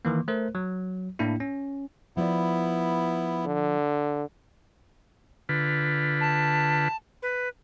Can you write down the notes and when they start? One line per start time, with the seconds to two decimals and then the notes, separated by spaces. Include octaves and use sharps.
0.05 D#3 E3 A#3
0.28 A3 A#4 C5
0.55 F#3
1.19 A2 A#3 D4 E4
1.40 C#4
2.17 F3 B3 E4 D5
3.46 D3
5.49 D3 F4 B4
6.21 A5
7.22 B4